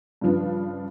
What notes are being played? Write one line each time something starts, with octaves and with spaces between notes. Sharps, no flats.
G2 C#3 F3 D4 B4